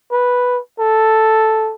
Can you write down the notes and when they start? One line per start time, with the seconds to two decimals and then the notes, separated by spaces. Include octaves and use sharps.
0.12 B4
0.79 A4